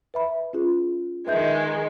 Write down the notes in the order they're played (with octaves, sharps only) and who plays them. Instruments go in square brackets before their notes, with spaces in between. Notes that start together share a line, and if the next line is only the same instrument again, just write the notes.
[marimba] B4 E5 B5
C#4 F4 G#4
[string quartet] D#3 G#3 [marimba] B4 E5 G6